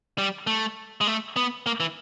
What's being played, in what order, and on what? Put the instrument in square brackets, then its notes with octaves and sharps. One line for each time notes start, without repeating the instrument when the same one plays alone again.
[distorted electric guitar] G3
A3
G#3
A3
B3
A#3
E3